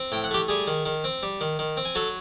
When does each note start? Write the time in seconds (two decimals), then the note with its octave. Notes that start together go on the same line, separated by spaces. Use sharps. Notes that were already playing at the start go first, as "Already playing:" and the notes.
Already playing: C4
0.12 A2 G5
0.24 F#5
0.31 A3 G4 G5
0.48 G3 G#4 G#5
0.67 D#3
0.86 D#3
1.04 C4
1.23 G3
1.41 D#3
1.59 D#3
1.77 C4
1.85 G#5
1.95 F#3 A4 A5